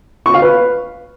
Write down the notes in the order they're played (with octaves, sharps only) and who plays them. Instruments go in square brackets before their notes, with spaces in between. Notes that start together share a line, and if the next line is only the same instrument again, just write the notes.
[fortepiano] C#6
F5
B4